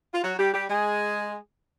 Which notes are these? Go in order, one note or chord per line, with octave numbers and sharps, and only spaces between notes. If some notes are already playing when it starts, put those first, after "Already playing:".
F4
F#3 F#4
G3 G4
G3 G4
G#3 G#4